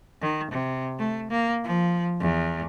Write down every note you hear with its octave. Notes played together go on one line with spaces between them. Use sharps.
D#3
C3
A3
A#3
F3
E2